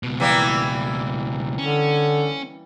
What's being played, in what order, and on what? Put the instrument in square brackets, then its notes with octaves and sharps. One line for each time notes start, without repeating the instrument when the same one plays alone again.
[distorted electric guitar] C#2 B2
[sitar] E3 G3 A#3
[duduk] D3 [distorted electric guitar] C#4